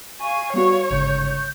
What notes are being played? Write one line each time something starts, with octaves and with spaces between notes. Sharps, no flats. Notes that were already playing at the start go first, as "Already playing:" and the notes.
F5 G#5 C#6
G3 B3 F#4 C#5
G1 G#2 C#3 G6